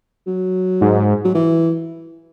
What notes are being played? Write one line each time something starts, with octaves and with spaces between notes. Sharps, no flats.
F#3
G#2
F#3
E3